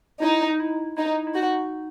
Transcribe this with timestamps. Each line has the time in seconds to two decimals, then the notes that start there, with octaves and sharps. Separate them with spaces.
0.22 D#4 E4
0.50 D#4
0.60 E4
0.97 D#4 E4
1.27 E4
1.34 D#4 F#4